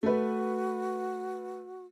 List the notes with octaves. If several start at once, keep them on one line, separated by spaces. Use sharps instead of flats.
A3 F#4 B4